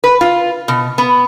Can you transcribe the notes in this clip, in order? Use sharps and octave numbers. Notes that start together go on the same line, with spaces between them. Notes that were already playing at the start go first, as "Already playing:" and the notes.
B4
F4
B2
B3